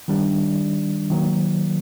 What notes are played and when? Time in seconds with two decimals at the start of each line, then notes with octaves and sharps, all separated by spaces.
0.08 D#3 G3 D4
1.10 D#3 F#3 A#3